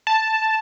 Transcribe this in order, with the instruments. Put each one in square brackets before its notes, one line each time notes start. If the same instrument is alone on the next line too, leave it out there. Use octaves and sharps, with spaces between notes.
[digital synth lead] A5